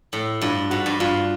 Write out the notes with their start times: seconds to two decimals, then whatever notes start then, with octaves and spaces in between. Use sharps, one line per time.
0.13 A2
0.41 G2 F4
0.70 G#2 F#4
0.86 G2
1.00 G2 F4